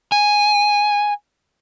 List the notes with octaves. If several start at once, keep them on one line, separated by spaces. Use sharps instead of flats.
G#5